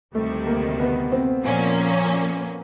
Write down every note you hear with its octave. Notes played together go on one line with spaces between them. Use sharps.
D2 C3 D#3 G3 A3
A#3
B3
C4
A#2 F3 A#3 C#4